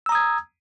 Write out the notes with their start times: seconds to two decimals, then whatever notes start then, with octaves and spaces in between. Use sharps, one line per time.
0.06 E6
0.09 A#5
0.12 D#6
0.15 G#6